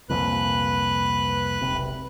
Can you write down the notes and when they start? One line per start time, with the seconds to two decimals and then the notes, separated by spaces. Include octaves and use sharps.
0.09 C2 F2 A#2 B4 F#6
1.62 E1 B1 C3